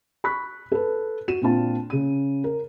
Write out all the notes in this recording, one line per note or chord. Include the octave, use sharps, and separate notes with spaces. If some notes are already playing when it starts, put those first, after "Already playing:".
B5 C#6 F#6 B6
A4 B4
F#4 D#7 E7
A#2 C4 D4 F4 A5
C#3 D#7
A#4